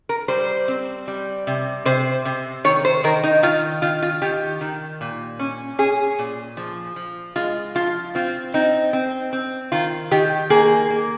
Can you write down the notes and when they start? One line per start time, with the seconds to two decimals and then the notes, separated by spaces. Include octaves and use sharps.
0.09 A#4
0.28 G3 C5
0.68 C4
1.08 G3
1.47 C3
1.86 C3 C5
2.25 C3
2.64 D#3 C#5
2.85 C5
3.04 D#3 A#4
3.24 D#4
3.43 D#3 F4
3.82 D#3 F4
4.02 F4
4.22 D#3 G4
4.61 D#3
5.01 A#2
5.39 C#4
5.79 C#4 G#4
6.19 A#2
6.57 F3
6.96 F3
7.36 G#3 F4
7.75 F3 F4
8.15 C4 F4
8.54 C4 D#4
8.93 C4
9.33 C4
9.72 D#3 F4
10.11 D#3 G4
10.50 A#3 G#4
10.90 A#3